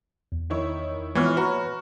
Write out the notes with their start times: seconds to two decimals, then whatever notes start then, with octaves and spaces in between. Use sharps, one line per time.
0.32 E2
0.50 D#3 E4 C#5
1.15 A#1 E3 G#3 B3 F4 C#5 F6
1.37 F#4 B4 A#5 B5